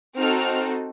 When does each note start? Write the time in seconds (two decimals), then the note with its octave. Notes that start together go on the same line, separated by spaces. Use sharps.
0.16 C4 D#4 F#4 A4 F6